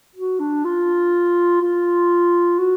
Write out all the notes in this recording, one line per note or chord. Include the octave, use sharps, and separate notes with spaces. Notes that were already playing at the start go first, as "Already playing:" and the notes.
F#4
D4
F4
F4
F#4